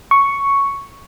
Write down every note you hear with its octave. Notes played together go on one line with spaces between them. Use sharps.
C#6